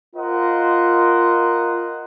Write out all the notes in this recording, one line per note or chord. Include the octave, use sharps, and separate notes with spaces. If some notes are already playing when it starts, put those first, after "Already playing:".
F4 A#4 C5 D#5 F#5